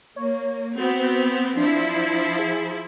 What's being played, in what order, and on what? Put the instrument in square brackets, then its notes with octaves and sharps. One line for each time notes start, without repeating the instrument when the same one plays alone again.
[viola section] A#3 [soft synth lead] C#5
[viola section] B3 C4 [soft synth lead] F#4
[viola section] F3 E4 [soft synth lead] D4
[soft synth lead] G#4